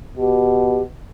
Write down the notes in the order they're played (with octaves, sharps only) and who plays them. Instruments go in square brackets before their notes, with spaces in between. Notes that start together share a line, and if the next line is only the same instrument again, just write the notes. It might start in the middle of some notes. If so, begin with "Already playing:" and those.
[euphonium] B2 [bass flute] G4